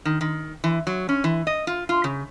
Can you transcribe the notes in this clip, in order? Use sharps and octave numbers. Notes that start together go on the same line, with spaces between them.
D#3
D#3
E3
F#3
C#4
E3
D#5
F4
F4
C#3